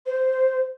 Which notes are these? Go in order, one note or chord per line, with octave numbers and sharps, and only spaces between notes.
C5